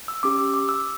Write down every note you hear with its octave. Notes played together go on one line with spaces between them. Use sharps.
E6
C#4 G4 D6
E6
D6
E6